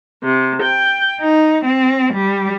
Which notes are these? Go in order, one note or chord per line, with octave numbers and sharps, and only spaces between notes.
C3
G5
D#4
C4
G3